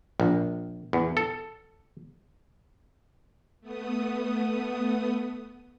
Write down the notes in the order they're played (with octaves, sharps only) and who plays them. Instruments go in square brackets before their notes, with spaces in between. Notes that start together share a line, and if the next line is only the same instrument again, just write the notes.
[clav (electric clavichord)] A#1
E2
A4
[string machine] A3 B3 D#6